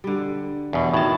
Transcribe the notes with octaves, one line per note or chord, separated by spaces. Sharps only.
D3 G3
E2 B2
A2 D#3 F#3 A5